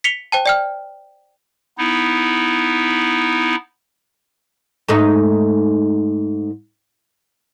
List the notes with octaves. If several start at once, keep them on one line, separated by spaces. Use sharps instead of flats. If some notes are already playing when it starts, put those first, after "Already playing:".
B6 C#7 F7 G7
C5 G5 A5
D5 G5 F6
B3 D#4 E4
G#2 A3 D#4